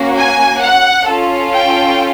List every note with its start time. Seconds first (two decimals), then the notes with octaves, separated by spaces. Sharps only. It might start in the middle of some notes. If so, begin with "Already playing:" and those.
Already playing: A#3 C#4 F#4
0.17 G#5
0.61 F#5
1.07 C#4 F4 A4
1.53 G5